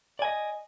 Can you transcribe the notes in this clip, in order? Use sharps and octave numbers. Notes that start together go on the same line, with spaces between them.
D5 D#5 G#5